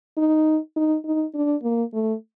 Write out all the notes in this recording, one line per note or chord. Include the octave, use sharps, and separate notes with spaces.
D#4
D#4
D#4
D4
A#3
A3